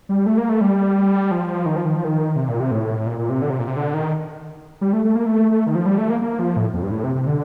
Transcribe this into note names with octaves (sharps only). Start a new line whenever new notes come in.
G3
A3
A#3
A3
G3
F3
D#3
F3
D#3
F3
D#3
C3
A#2
C3
A2
A#2
A#2
C3
D3
C3
A#2
C3
D3
D#3
G3
A3
A3
A#3
A3
A3
D#3
F3
G3
A3
A#3
A#3
F3
A2
F2
G2
A2
C3
C3
D3